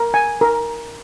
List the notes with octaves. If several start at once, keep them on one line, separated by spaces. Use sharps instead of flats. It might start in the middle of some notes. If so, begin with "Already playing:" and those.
Already playing: A#4
G#5
A#4